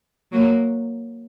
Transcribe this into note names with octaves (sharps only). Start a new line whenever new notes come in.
F#3 A#3